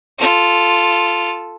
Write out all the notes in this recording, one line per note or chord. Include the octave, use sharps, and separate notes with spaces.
F4 A4